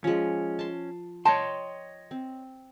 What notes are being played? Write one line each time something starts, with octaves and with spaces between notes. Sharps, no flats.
F3 G#3 C#4
A5 C6
C#5 D#5 G5 A5 C6
C4